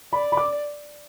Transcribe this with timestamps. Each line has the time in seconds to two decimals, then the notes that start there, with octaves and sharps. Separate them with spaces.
0.13 D5 B5
0.32 B5
0.37 D6